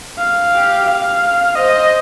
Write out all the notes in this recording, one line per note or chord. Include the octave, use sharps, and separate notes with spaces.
F5
G4
F5
C5 D#5